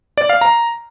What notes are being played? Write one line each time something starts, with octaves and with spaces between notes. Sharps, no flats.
D5
F5
A#5